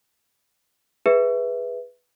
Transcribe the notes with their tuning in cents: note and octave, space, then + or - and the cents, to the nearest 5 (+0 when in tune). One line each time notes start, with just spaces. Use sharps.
G#4 -5 B4 +0 E5 +0